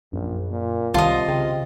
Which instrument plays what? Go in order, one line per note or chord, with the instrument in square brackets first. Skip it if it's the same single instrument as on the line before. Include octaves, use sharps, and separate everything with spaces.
[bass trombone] A#1 [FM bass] F#2
[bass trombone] A#2
[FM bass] C2 [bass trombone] C3 [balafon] D#3 A5 C6 [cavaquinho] F4 D#5
[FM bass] C#3 [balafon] G5